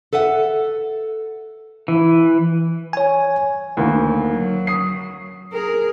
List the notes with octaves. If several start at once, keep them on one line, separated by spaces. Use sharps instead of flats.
A4 B4 E5 F#5
E3
C#5 G#5
D2 D#3 A#3
F#3
D#6 C7
G#4 A#4